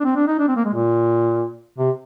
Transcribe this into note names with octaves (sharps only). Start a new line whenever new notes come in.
D4
C4
D4
D#4
D4
C4
A#3
G#3
A#2
C3